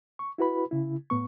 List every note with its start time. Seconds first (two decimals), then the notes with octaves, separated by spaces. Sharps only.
0.19 C#6
0.38 E4 F#4 B4 B5
0.71 C#3 E4
1.10 A2 B3 C#6